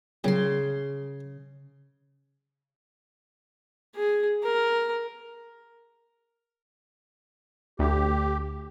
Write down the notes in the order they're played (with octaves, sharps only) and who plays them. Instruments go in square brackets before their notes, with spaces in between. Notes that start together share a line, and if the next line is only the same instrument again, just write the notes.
[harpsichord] A#2 F#3 G3 [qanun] C#3 C6
[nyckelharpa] G#4
A#4
[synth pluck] D2 [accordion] G4